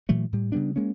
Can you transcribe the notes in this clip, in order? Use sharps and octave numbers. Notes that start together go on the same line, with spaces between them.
A#2 E3 F#3 A3
A2 G3
C#3 G3 B3 D4
G#3 A#3 C#4